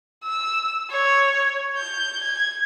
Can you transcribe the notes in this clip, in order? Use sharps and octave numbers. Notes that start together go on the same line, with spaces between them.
E6
C#5
G6
G#6